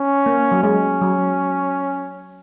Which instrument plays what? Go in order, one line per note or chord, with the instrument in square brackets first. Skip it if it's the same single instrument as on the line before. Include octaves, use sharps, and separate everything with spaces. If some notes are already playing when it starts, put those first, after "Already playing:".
Already playing: [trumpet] C#4
[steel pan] A#3
F#3
[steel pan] G#3 [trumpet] C#4
[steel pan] F#3